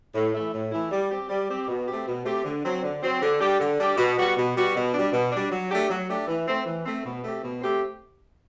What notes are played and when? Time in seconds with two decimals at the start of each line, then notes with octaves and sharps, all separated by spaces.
0.15 A2
0.34 E3 A3 E4
0.53 A2
0.72 E3 A3 E4
0.91 G3
1.10 C4 G4
1.30 G3
1.49 C4 G4
1.68 B2
1.87 A3 C4 G4
2.07 B2
2.25 A3 C4 G4
2.45 D3
2.64 F#3 C4
2.83 D3
3.02 F#3 C4
3.22 D3
3.40 G3 D4 G4
3.60 D3
3.79 G3 D4 G4
3.97 B2
4.16 G3 B3 F#4
4.36 B2
4.55 G3 B3 F#4
4.75 B2
4.93 G3 D4
5.12 B2
5.32 G3 D4
5.51 F#3
5.71 A3 D4 G4
5.90 F#3
6.08 A3 D4 G4
6.27 E3
6.47 A3 C4
6.65 E3
6.85 A3 C4
7.04 B2
7.23 A3 C4 G4
7.42 B2
7.62 A3 C4 G4